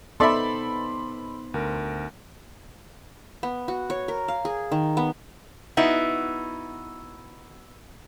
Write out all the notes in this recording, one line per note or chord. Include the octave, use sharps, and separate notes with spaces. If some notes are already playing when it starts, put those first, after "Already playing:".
B3 D#4 A4 C5 D5 E5 B5 C6
D2 A#4
B3
F#4
C#5
A#4
F5
G#4
D#3
B3
B3 D#4 E4 F#4